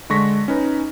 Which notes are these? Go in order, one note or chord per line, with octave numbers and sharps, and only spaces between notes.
D3 G#3 C#6 A#6 B6
C#4 D#4 B4